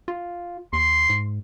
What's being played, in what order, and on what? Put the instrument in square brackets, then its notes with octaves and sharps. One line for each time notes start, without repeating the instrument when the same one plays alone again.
[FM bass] F4
[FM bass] D#2 [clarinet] C6
[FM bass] G#2